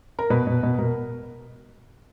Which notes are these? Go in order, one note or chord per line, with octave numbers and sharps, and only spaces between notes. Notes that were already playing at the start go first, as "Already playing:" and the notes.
A#4
B2 B4
B2
B2
B2 A#4